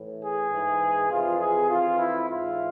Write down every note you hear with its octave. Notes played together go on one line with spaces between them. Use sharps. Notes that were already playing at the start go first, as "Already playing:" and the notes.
Already playing: A2 E3
G#4
G#2 E3
F2 C3 E3 F4
G#4
F2 E3 F4
E4
G#2 E3 F4